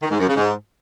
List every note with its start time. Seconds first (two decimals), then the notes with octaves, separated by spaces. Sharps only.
0.02 D#3
0.11 G#2
0.19 F#2
0.28 C#3
0.36 G#2